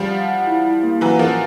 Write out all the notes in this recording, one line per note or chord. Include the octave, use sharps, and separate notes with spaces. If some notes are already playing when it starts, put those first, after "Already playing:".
Already playing: F3 G3
F#5
F#5
E4
E4
A#3
E3 F#3 F#5
F3 A#4